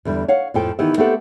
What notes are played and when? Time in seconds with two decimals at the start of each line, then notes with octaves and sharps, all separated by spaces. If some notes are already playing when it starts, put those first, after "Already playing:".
0.05 E2 D3 G3
0.28 C#5 F5 F#5
0.54 F2 A2 F3 A4 G5
0.79 D#3 E3 B3 G4 E5
0.97 A3 B3 C4 G4 A4 F#5